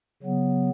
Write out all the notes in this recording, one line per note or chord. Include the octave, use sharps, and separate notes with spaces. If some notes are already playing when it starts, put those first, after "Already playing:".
C#3 F#3 B3